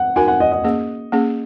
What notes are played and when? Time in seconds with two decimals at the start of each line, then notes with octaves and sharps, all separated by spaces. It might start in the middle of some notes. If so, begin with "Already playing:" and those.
Already playing: F#5
0.16 D#4 F#4 A#4 G#5
0.28 F#5
0.40 D#5
0.52 D#5
0.64 A#3 C#4 G#4
1.12 A#3 C#4 G#4